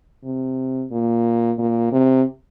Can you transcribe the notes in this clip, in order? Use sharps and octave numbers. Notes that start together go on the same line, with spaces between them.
C3
A#2
A#2
C3